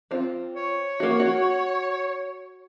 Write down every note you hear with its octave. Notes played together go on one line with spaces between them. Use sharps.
C4 F4
C#5
A#3 F#4
F#4